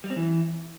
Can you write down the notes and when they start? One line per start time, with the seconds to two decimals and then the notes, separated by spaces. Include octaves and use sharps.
0.04 G3
0.10 C4
0.16 E3